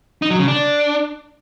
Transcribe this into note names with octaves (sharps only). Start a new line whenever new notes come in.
D#4
F#3
C#3
D4